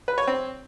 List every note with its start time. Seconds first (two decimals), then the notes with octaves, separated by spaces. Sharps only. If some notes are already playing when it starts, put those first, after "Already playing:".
0.08 B4
0.18 C#5
0.27 C4